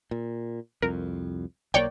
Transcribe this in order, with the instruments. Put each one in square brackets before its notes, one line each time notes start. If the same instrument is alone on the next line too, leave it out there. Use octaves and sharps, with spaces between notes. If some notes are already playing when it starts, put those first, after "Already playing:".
[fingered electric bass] A#2
[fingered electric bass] C2 F2 [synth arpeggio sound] A#4
[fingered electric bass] B1 F3 A#3 [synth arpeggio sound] C#5 D5 G5